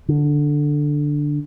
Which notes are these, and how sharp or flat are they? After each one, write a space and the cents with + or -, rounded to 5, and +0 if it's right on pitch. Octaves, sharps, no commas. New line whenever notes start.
D3 +0